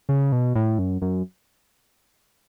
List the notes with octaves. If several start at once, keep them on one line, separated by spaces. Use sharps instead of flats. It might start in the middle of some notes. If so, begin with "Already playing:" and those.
C#3
B2
A2
F#2
F#2